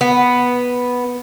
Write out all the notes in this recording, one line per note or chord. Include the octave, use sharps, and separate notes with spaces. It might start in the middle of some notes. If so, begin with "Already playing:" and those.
B3